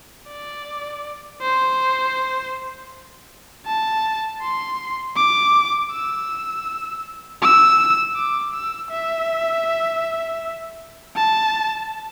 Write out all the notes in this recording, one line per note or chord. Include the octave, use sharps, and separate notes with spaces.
D5
C5
A5
C6
D6
E6
E6
D6
E6
E5
A5